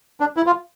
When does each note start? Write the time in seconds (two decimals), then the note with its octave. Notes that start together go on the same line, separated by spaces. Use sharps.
0.20 D4
0.37 E4
0.46 F4